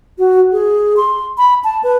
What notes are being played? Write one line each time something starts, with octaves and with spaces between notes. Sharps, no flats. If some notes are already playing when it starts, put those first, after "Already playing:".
F#4
G#4
C6
B5
A5
B4